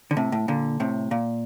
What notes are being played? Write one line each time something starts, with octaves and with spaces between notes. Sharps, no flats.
D3
A2 C3
A2
A#2 D3
A2 C3
A#2